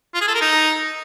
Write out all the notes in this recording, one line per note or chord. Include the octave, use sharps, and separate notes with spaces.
F4
G#4
A4
A#4
D#4